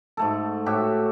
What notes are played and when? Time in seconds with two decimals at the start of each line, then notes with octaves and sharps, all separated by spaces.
0.17 G#2 A3 A4
0.66 A2 F#4 G4 E5